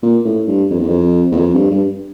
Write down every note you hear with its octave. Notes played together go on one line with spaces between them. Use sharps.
A#2
A2
G2
F2
E2
F2
E2
F2
G2
G2